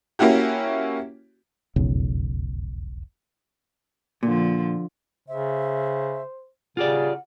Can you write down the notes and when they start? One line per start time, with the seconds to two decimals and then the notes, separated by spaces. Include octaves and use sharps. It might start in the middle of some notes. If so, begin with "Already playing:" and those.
0.19 A#3 C#4 E4 F#4 G4
1.76 E1 B1 F2 C#3
4.23 A#2 D3 F3
5.28 C#3 C5 E5
6.77 C#3 F4 G4 G#4 D5 F#5